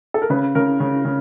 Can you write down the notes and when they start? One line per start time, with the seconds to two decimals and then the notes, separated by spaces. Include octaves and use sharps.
0.14 A4
0.22 A#4
0.30 C#3 B4
0.55 C#3 A#4
0.80 C#3
1.05 C#3